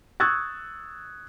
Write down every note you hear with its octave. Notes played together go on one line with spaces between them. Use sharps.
C#6 D#6 E6 F#6 G#6 A6